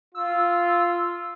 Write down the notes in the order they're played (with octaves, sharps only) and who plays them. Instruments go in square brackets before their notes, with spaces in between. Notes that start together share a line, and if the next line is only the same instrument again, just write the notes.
[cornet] F4 [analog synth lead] E6